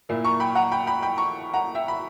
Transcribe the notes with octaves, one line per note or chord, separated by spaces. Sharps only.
A#2 A#3 E4
A#5 C#6
G5 B5
F#5 A#5
G5 B5
G5 B5
G5 B5
A#5 C#6
F#5 A#5
E5 G5
B5